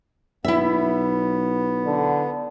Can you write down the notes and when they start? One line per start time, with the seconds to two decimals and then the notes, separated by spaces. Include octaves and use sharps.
0.44 B1 B3 E4 E5
1.86 D3